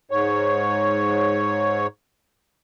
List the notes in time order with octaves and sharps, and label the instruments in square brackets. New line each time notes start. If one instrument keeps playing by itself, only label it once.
[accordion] G#2 C#5